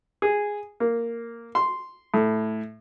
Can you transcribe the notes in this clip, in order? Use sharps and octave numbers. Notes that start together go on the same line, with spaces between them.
G#4
A#3
C6
A2